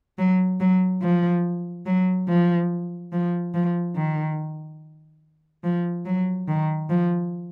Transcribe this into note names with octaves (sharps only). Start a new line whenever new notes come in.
F#3
F#3
F3
F#3
F3
F3
F3
D#3
F3
F#3
D#3
F3